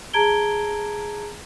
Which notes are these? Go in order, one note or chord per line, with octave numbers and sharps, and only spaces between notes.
G#4 A5 A#5 G#6 D7 G7